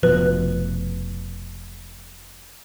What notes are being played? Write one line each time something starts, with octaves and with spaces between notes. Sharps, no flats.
F1 B2 F3 B4